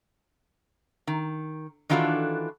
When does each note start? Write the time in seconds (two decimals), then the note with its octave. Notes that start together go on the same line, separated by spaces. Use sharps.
1.07 D#3
1.89 D#3 E3 D4 F4 F#4 A4